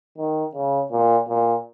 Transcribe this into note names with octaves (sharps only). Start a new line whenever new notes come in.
D#3
C#3
A#2
A#2